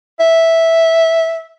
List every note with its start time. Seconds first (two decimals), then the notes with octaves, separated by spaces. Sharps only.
0.20 E5